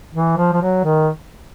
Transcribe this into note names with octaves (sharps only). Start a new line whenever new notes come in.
E3
F3
F3
F#3
D#3